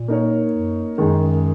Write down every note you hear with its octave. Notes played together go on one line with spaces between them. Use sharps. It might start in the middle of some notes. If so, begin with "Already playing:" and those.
Already playing: A#2
A#3 D#4 A#4 C#5
F#2
F#2 D#3 G#3 D#4 G#4